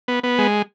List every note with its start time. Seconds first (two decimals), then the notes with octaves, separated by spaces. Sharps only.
0.08 B3
0.23 B3
0.39 G#3